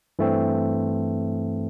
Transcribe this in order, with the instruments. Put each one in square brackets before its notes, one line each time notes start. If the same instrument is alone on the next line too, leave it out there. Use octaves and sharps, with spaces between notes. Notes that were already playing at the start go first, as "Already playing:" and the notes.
[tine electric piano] G2 E3 A3 C4